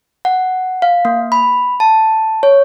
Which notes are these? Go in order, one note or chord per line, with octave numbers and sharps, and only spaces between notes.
F#5
F5
A#3
B5
A5
C#5